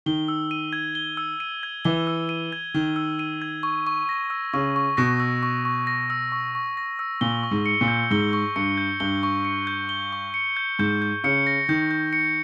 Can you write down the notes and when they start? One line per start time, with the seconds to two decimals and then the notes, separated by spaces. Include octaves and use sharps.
0.06 D#3 G7
0.28 E6
0.51 D#7
0.73 G#6
0.95 G7
1.17 E6
1.40 D#7
1.63 G#6
1.85 E3 G7
2.07 E6
2.29 D#7
2.52 G#6
2.74 D#3 G7
2.96 E6
3.19 D#7
3.42 G#6
3.63 C#6
3.87 C#6
4.09 A#6
4.30 E6
4.53 C#3 C#6
4.76 C#6
4.97 B2 A#6
5.20 E6
5.43 C#6
5.65 C#6
5.87 A#6
6.10 E6
6.32 C#6
6.55 C#6
6.77 A#6
6.99 E6
7.21 A#2 G7
7.43 C#6
7.51 G#2
7.66 C#7
7.81 A#2
7.88 G6
8.11 G#2 G7
8.33 C#6
8.56 G2 C#7
8.78 G6
9.00 G2 G7
9.23 C#6
9.45 C#7
9.67 G6
9.89 G7
10.13 C#6
10.34 C#7
10.57 G6
10.79 G#2 G6
11.02 G6
11.24 C#3 C#7
11.47 A#6
11.69 D#3 G6
11.91 G6
12.13 C#7